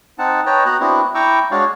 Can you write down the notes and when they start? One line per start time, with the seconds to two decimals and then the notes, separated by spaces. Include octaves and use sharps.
0.19 C4 D#4 F#5 A5
0.46 B4 C#5 D#5 G5 A5 A#5
0.66 B3 F#4 A#5 F#6
0.80 B3 C4 D4 E4 F#4
1.15 E4 G5 A#5 C#6 D6 E6
1.51 G#3 D4 F#4 C#5 D5 F5